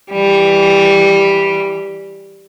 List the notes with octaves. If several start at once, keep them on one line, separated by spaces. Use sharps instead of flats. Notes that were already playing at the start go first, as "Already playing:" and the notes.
E3 G3